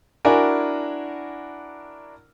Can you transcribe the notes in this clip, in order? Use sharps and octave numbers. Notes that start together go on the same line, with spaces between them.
D4 E4 F#4 A#4 G#5